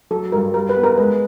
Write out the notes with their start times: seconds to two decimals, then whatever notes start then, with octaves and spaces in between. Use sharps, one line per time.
0.11 F#3 A4
0.32 G2 A#4
0.54 G3 A#4
0.69 B4
0.76 B3
0.84 A#4
0.98 G#3 B4